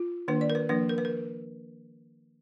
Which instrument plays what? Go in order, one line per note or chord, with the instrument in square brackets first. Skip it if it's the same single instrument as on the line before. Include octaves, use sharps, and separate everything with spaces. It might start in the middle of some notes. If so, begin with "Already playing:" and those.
Already playing: [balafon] F4
D#3 A#3 D4 B4
D5
A#4
B4
F3 A#3 D4 B4
A#4
B4
A#4